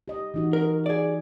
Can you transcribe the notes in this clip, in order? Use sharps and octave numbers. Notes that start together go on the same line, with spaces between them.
G4 D#5
E3 D#4 F#4
A#4
G#4 D5